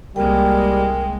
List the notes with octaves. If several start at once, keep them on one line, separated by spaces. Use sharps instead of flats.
C2 G3 G#3 A#3 A#4 G5